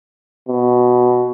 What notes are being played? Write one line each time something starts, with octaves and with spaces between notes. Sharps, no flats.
B2